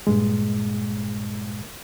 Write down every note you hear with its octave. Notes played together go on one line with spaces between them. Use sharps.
G2 A#2 G#3